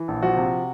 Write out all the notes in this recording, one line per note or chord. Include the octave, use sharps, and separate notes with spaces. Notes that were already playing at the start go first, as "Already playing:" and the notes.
Already playing: E3
A#1
F3 F#4
C3